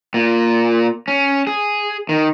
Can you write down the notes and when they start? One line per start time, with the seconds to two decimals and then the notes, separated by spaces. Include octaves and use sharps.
0.14 A#2
1.08 C#4
1.47 G#4
2.09 D#3